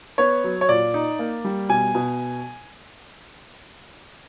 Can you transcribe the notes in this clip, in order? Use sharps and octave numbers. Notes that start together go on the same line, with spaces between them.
B3 C#5
F#3
C#5
A#2 D5
D#4
A#3
G3
B2 G#5
B2